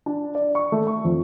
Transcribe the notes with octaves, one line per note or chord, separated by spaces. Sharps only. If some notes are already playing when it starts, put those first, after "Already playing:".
D4
D5
C#6
A3
C#6
F2